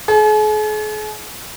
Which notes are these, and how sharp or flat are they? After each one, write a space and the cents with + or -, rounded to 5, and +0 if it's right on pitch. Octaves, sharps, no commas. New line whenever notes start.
G#4 +45